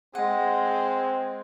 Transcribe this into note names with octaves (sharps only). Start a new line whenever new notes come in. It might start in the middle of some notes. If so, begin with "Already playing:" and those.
G#3 C4 F#5